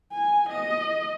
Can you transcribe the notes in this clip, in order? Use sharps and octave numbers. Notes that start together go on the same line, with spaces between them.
G#5
D#5